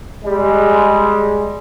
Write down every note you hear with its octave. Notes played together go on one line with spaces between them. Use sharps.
G3 G#3